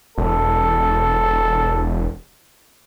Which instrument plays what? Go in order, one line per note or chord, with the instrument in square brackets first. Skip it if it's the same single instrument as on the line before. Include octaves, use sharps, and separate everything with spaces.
[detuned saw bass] E1 [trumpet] A4